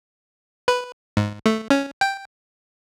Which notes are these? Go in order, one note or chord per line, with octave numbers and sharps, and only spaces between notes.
B4
G#2
A3
C#4
G5